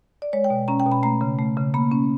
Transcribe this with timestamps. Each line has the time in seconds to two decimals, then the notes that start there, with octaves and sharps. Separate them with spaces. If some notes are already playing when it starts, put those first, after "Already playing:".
0.22 D5
0.33 G#3 C#5
0.44 G5
0.50 B2
0.68 C#4 A#5
0.80 G5
0.86 B2
0.92 B5
1.03 A3 A#5
1.21 C#3
1.39 A3
1.57 C#3
1.74 A#3 B5
1.91 C#4